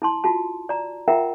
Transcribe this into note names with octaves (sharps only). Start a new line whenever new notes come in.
E4 A5 C6
F4 F#4 A5
D5 A#5
F4 A#4 E5 F#5 G5 A#5